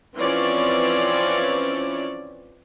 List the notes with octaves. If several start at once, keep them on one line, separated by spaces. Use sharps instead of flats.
E3 F3 C4 C#4 C#5 D5